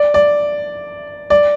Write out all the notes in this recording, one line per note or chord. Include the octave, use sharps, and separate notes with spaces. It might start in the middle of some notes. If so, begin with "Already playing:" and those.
Already playing: D5
D5
D5